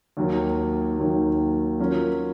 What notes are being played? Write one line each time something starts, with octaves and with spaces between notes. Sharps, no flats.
D#2 D#3 F#3 A#3
D#2 D#3 F#3 A#3
F#3 C#4 F4 A#4